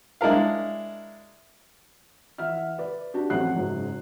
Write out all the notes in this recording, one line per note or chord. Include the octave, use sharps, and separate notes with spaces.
G#3 D4 E4 A#4 F5
E3 E5 F#5 F6
B4 D5
D4 F#4 G4
A1 F2 F#3 F#5 F#6 C7
F#1 G#2 F#3